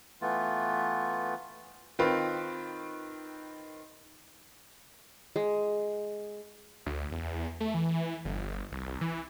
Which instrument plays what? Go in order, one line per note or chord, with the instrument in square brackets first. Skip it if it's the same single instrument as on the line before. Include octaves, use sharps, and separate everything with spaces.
[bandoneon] E3 A3 B3 F4
[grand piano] D#3 C4 F4 B4
[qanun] G#3
[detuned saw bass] D2
E2
A3
E3
G1
C2
E3